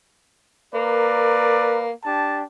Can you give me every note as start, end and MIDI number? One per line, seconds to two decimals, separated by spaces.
0.75 1.91 58
0.75 1.92 70
0.75 1.92 71
0.75 1.92 74
2.05 2.43 62
2.05 2.43 67
2.05 2.43 81